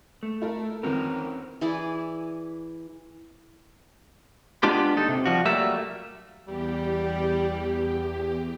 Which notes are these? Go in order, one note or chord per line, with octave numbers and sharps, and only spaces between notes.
A3
E4 A4 A#4
F2 D#3 E3 C4 C#4 A#4
E3 E4 G#4 D5
G#3 B3 D4 F4 G4
D#2 D#4 A4
C3
F3 G3 F#4
F#3 G3 A3 A#3 E5
E2 G3 G4